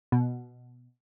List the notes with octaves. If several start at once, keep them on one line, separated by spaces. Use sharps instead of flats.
B2